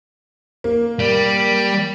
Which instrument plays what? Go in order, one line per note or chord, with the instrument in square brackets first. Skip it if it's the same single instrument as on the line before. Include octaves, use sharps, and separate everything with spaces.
[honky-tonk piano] A#3
[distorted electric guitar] G3